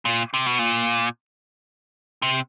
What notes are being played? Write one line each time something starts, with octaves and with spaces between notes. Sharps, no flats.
A#2
C3
B2
A#2
C3